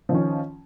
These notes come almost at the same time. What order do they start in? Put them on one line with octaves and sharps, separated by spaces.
F3 D#3 C#4